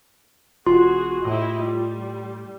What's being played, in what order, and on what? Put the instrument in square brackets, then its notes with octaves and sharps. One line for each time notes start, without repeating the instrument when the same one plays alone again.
[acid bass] E1 [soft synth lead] F4 [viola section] F#4 G#4 [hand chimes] C6
[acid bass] A2 [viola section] E4 G4 D#5
[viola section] G3